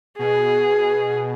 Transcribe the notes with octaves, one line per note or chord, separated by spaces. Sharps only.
B2 G#4